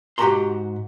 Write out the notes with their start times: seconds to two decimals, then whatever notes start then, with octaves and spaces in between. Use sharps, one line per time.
0.18 G#2 F#4 G4 A5 A#5 C6